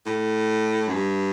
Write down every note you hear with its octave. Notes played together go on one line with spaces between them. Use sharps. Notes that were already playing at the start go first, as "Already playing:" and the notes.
A2
F#2
G2